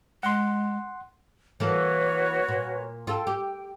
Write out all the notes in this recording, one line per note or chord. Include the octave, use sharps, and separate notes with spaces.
G#3 F#5 C6
E3 A#3 F#4 A4 B4 C#5
A#2
F4 A4 G5
G4